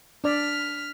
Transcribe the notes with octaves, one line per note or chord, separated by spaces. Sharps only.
D4 D5 F6 B6